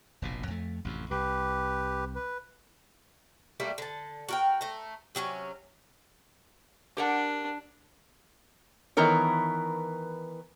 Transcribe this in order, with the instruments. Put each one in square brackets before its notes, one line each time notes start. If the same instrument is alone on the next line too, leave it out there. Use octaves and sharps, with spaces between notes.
[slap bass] F1 A#1 B2
F2 A3
A1 F2 C3
[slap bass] C2 [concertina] G4 B4
[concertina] B4
[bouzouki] G3 A3 A#3 E4
D3 A5
F#4 A#4 G5
A3 A#5
C3 F#3 C4 C#4
[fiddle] D4 [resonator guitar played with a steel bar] G4 A#4 F#5
[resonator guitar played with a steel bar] D#3 E3 B3 A#4 C#5